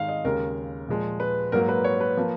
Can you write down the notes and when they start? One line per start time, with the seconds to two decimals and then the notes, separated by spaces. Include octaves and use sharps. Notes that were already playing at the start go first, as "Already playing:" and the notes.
Already playing: G#2 D#3 G#3 F5
0.09 D#5
0.25 D#2 C#3 G#3 A#4
0.88 A#2 F3 G#3
1.20 B4
1.52 G#2 F#3 A#3 A#4
1.69 B4
1.84 C#5
2.01 B4
2.17 F3 A#3